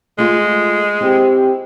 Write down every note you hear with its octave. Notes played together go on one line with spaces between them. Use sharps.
G#3 A3 F4
C4 E4 G4